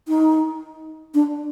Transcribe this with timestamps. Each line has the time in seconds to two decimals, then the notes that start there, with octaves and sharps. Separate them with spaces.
0.08 D#4
1.14 D4